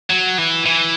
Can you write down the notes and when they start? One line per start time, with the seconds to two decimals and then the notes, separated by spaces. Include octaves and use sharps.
0.10 F#3
0.38 E3
0.66 E3